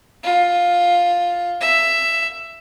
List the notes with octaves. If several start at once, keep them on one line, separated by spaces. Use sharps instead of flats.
F4
E5